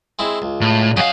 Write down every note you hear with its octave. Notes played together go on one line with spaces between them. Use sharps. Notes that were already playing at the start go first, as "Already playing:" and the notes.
G#3 C4 E4
C#2
A2
F#2 C#4 F#4 D#5 F5